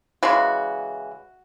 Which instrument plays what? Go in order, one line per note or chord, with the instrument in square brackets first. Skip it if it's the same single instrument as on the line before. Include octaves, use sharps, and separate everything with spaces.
[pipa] C#3 E3 G#3 F#4